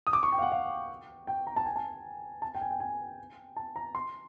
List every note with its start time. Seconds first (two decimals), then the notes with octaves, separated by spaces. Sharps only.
0.07 D#6
0.13 D6
0.23 C#6
0.32 G5
0.38 F5
0.42 F#5
0.52 F5
1.27 G5
1.47 A#5
1.56 A5
1.66 G#5
1.76 A5
2.42 A5
2.55 G5
2.61 G#5
2.71 G5
2.80 G#5
3.56 A5
3.76 A#5
3.95 C6